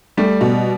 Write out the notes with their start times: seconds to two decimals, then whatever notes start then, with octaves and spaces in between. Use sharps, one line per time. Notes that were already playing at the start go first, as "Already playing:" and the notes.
0.17 G3 A3
0.41 B2